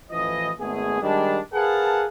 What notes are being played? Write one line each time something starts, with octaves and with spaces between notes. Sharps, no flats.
A1 E3 F3 D#5
G#1 A3 B3 G#4
D#3 G3 G#3 D4
G#4 A#4 B4 F5 F#5 A5